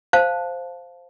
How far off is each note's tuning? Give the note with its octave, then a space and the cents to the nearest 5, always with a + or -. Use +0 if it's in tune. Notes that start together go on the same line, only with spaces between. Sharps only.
C5 +0 F5 +0 A5 +0